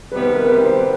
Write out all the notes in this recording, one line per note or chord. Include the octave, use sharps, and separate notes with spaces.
C3 D#3 G3 B3 B4
A#4
C3 D#3 G3 B3 B4
C5
B3